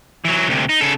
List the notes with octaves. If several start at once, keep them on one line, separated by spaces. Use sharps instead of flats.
E3 F#3
D2 C3
D#4
C#3 A4